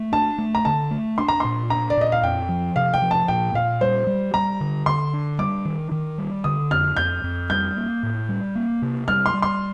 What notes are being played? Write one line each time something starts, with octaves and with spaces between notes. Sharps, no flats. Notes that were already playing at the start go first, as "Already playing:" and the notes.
Already playing: A3
D4 A5
A3
A#5
D3 A5
A3
D4 C6
A#5
A#2 C6
D4 A#5
D5
A#2 D#5
F5
F2 G5
F3
C3 F5
G5
F3
A5
A#2 G5
A#2 F5
G3 C5
G3
G3 A#5
D3
D3 C6
D4
G3 D6
D#3
D#3
G3
D3 D#6
F2 F6
F2 G6
F2
G3 G6
A#3
A2
G3
A#3
C3
G3 F6
C6
G3
C6